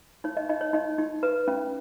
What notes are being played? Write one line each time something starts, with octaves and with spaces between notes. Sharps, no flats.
D#4 C#5
D#5
D#4 D#5
C#5
D#4 D#5
D#4
B4
C#4